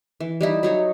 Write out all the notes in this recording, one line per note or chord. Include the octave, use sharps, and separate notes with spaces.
E3
G3 D#4 E4
F#3 D#4 C#5